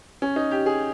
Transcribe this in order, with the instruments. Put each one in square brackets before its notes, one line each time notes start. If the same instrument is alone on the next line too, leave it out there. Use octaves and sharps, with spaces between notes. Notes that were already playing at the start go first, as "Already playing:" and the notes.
[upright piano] C#4
D#4
G4
G#4